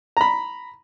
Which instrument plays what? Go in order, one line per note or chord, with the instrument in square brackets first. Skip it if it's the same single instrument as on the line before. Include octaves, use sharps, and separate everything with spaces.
[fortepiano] A#5 B5